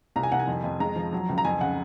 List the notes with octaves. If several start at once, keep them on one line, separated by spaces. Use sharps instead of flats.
C2 A#5
G#5
C2 F#5
G#5
F2
F2
G#3 A#5
F3
F#3
C#2
A#5
F2 G#5
C#3 F#5